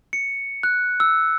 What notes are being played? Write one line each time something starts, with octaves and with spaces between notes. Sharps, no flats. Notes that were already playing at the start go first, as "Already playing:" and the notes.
C#7
F#6
E6